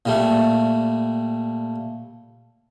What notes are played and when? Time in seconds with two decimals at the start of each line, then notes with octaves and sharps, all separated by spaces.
0.06 A#2 G3 A3